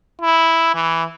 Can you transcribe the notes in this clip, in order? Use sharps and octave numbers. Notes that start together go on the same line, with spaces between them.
E4
E3